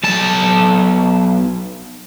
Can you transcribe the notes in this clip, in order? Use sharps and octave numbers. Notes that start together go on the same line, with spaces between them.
B1 A5